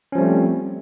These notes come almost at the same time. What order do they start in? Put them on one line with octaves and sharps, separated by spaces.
C#4 F3 G3 A3 C4